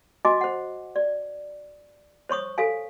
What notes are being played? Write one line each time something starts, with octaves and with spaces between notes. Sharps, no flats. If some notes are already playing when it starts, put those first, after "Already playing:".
F#4 D#5 G#5 D6
C5 F#5
D5
C5 C#5 C#6 D#6
A4 F5 G#5